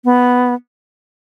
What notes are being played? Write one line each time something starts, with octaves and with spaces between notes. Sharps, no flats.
B3